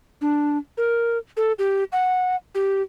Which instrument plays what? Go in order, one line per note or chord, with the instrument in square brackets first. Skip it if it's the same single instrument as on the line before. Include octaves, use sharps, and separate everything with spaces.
[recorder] D4
A#4
A4
G4
F#5
G4